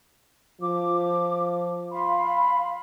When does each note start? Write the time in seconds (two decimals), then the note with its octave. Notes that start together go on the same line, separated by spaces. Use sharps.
0.61 F3 D6
1.92 F5 B5 C6